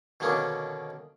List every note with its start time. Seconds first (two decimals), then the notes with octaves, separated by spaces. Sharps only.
0.20 B2 D3 D#3 A#3 C#4 D4